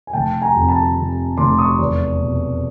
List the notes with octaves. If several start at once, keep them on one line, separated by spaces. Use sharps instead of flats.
G#5
F1 G5 A5
G#5 A#5
F2
A5 B5
C3
F1 C6 D6
C#6 D#6
E2
B2